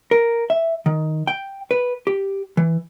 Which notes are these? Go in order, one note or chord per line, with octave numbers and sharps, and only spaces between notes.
A#4
E5
D#3
G5
B4
G4
E3